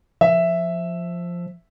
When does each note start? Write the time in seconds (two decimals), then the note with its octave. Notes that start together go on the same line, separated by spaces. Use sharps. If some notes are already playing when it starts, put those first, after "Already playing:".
0.21 F3 E5